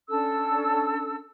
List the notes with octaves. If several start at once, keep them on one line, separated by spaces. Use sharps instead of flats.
C#4 D4 A4 E6